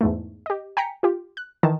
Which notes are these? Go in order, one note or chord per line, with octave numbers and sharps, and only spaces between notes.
E2 G#2 A3
G4 D#5
G5 G#5 A#5 B6 C#7
F4 G4
F#6
D#3 E3 A5